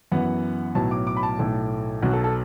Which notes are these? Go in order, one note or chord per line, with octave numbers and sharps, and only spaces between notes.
F#2 E3 B3 F#5
B1 A2 F#3 B3 A5
D6
D6
B5
A5
B1 A2 A3 A4
B1 B2 F#3 F#4
A4
A4